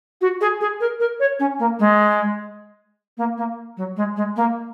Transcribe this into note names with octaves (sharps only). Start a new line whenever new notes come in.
F#4
G#4
G#4
A#4
A#4
C#5
C#4
A#3
G#3
A#3
A#3
F#3
G#3
G#3
A#3